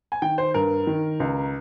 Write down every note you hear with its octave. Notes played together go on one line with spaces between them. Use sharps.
G#5
D#3 G5
C5
G2 A#4
D#3
C#2